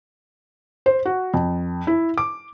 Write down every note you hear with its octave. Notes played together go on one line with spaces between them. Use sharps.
C5
F#4
F2
E4
D6